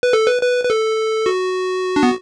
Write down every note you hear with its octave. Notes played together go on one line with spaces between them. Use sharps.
B4
A4
B4
B4
B4
A4
F#4
D4
B3